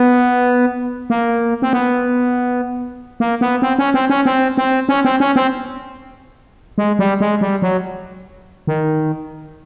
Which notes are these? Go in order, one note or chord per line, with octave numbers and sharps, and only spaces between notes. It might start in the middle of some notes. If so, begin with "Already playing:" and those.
Already playing: B3
A#3
C4
B3
A#3
B3
C4
C#4
C4
C#4
C4
C4
C#4
C4
C#4
C4
G#3
G3
G#3
G3
F#3
D#3